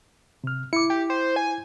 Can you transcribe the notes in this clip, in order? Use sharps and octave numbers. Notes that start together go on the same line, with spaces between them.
C3 F6
E4 D6 C#7
G4
C5
G#5